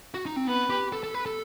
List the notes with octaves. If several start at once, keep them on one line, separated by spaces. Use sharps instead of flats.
F#4
D#4
C4
B3 B4
G4
A4
A4
B4
A4